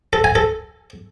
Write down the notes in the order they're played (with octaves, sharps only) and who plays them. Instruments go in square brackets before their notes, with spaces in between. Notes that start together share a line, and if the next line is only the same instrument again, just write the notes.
[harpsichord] A4
G#5
A4